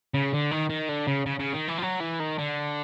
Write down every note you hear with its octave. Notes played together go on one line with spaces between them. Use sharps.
C#3
D3
D#3
D#3
D3
C#3
C#3
C#3
D#3
E3
F3
F#3
E3
D#3
D3